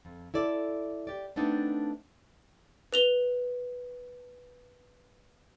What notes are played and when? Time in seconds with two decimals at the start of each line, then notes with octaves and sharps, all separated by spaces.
0.05 F2
0.34 E4 A4 D5
1.07 G4 D5
1.36 A3 B3 C4 D4 D#4
2.93 B4 F7 G7